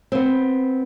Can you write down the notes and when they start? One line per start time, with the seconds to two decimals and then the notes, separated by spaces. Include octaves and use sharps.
0.12 B3 C4